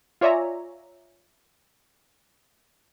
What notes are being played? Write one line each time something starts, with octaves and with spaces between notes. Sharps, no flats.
F4 C#5 D5 E5 G#5 A#5